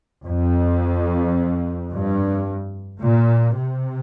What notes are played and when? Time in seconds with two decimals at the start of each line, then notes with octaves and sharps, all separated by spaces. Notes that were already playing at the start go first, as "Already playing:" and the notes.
0.24 F2
1.91 G2
3.01 A#2
3.57 C3